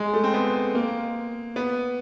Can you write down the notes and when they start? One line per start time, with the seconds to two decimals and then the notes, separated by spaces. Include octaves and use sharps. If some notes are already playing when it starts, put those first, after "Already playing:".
Already playing: G#3
0.13 A3
0.24 C4
0.34 B3
0.75 A#3
1.56 B3